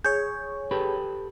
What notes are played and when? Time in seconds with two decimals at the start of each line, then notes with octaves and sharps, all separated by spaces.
0.04 G#4 C#5 G6
0.71 G4 A4 B4